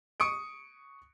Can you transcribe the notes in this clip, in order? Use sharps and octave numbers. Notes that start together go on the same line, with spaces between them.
C#6 D#6 C#7 D7